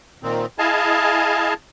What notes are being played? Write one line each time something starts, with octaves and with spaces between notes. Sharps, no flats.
A#2 D#3 C4
E4 G#4 D#5 F5 G#5 A5